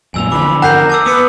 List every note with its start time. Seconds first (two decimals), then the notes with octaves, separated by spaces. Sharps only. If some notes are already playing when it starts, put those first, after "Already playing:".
0.14 A#1 F#2 A#2 G#5 E6 F7
0.32 E2 D3 F3 B5 D6
0.62 A#4 F#5 A#5 G6 C7
0.90 A5 D6 E6
1.06 B3 B4 D#6 C#7